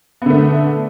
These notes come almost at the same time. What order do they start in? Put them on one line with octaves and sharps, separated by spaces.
B3 D3 A3